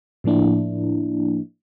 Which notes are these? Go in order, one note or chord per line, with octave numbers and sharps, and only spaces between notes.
A2 F3 A#3 D4 E4